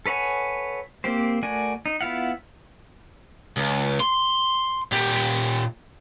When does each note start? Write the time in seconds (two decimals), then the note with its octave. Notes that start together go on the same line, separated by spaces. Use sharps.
0.06 A4 B4 C#5 F#5 G#5
1.04 A#3 C4 G4 C5
1.43 A3 F#4 A#4 D5 G#5
1.86 D#4
2.01 B3 E4 F4 F5 F#5
3.57 C#2
4.00 C6
4.92 A#2 G4